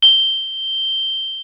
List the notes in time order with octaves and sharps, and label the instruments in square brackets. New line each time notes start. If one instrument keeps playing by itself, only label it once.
[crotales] G7